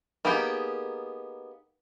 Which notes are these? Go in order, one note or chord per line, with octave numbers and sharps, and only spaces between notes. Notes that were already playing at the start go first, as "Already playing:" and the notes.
A#3 B3 D#4 G4 G#4